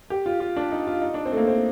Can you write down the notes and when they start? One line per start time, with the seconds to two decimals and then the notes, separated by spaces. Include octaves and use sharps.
0.10 G4
0.26 F4
0.40 F4
0.56 D4
0.72 D#4
0.87 F4
1.02 D#4
1.14 D4
1.26 C4
1.32 A3
1.37 A#3
1.48 C4